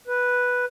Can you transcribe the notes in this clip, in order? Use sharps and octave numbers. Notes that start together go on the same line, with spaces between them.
B4